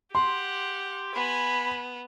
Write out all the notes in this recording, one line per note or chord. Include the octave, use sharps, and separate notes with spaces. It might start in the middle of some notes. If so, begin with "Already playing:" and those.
G4 F#5 C6
B3 G#5 B5